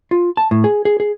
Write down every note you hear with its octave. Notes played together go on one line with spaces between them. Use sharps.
F4
A5
A2
G#4
G#4
G#4